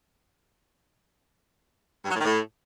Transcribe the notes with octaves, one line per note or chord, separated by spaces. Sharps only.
G2
F#3
A2
D#3
A2